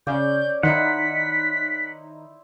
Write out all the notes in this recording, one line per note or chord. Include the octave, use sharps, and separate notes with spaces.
C#3 C#4 D5 G6
D#3 D#4 E4 C5 F#5 B6